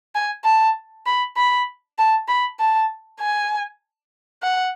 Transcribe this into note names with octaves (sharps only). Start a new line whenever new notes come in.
G#5
A5
B5
B5
A5
B5
A5
G#5
F#5